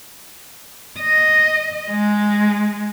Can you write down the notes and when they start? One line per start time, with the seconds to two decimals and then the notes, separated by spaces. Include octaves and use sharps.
1.00 D#5
1.90 G#3